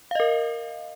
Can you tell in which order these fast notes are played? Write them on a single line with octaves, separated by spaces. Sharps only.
F5 D#5 A#4